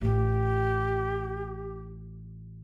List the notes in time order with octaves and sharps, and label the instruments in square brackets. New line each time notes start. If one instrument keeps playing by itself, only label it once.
[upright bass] A1 F4 [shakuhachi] G4